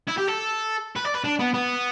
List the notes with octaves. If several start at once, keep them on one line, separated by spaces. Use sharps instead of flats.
E4
G4
A4
B4
D5
B4
D4
B3
B3